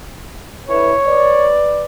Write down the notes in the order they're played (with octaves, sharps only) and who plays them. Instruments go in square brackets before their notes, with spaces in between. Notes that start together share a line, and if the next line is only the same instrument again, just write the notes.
[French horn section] D3 E4 B4 [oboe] C#5
[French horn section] B4 D5